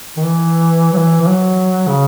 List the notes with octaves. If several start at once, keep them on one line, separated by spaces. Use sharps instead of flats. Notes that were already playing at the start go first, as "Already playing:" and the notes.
D#3
E3
F#3
E3
E3
F#3
C#3